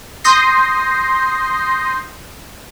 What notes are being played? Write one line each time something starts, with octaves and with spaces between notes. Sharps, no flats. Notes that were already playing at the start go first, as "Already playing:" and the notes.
C6 D#6 G6 A#6 C7